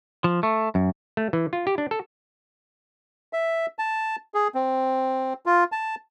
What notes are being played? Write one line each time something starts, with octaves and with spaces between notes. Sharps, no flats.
F3
A3
F#2
A3
E3
F4
G4
D4
A4
E5
A5
G#4
C4
F4
A5